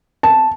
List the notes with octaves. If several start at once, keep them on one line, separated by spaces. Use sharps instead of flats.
A5